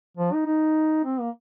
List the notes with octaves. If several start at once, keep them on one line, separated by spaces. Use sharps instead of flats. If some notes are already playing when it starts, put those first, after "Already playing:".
F3
D#4
D#4
C4
A#3